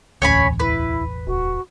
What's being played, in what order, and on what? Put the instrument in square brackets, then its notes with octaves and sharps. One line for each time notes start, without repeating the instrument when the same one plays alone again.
[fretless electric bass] E1 A1 [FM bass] D2 [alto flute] C#4 [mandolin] C#5 G#5 B5
[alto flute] E4 [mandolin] B4
[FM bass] D1 [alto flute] F#4